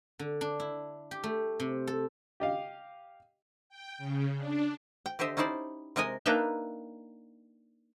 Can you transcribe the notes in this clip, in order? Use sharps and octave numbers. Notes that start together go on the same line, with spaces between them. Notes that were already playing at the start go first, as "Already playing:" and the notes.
D3
D4
E4
G4
A3
C3
A4
G4 D#5 F5
G5
C#3
D4
G5
D3 G4 C5 D#5 E5
C#4 D#4 E4 C5 D5
C3 G#3 A#4 D#5 G#5
A#3 D4 D#4 B4 E5 G5